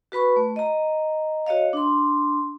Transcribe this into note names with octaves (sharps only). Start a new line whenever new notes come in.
F#4 B4 B5 C#6
A3
D#5 A#5
F#4 C#5 D#5 F5
D4 C6